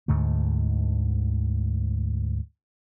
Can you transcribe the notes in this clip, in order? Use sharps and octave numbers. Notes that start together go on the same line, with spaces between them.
D2 G#2 D3 A3